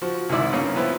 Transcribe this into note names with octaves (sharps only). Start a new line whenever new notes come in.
F3 F#4
C2 G#2 D#3 E4 D5
G2 C#3 A#3 C#4
F3 B3 C4 E4